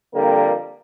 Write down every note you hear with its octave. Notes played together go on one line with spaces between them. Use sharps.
F2 D3 G3 A#3